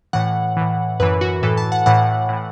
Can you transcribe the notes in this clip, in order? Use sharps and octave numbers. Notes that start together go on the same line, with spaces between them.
A2 E3 F#5
A2 E3
F#2 E3 B4
F#4
A2 E3 A4
A5
F#5
A2 E3 F#5
A2 E3